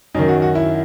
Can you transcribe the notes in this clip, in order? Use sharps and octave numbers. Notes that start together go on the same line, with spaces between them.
F#2 D#3 D#4
F#4
F#4
E4